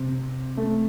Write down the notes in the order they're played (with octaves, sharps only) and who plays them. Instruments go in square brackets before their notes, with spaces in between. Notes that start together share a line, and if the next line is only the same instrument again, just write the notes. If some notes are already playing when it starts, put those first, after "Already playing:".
Already playing: [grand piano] C3
A3